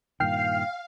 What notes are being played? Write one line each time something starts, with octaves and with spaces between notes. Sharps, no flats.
G2 A#2 D#3 F5 G5 F6 C7